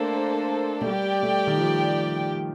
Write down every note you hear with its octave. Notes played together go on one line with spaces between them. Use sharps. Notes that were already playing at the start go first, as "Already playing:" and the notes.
Already playing: A3 A#3 D4 A4 C5
A3
G3 G4 D5 G5
A3
D#3
F3